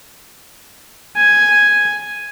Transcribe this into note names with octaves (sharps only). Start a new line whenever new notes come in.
G#5